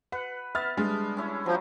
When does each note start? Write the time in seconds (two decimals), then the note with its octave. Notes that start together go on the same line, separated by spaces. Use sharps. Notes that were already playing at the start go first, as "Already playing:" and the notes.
0.12 B4 F#5
0.55 B3 E5 F6 A6
0.77 G3 G#3 D4 G#4
1.17 C#4 E4 C#5
1.46 F3 F#3